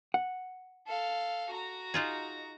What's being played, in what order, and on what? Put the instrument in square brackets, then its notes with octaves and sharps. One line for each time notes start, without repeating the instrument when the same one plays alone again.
[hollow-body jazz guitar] F#5
[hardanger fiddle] A4 F5
F#4 A#5
[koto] D#4 F4 G#4